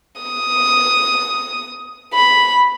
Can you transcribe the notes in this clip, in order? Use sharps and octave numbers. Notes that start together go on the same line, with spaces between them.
D#6
B5